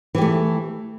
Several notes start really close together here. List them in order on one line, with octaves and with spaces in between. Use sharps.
E3 G4 A3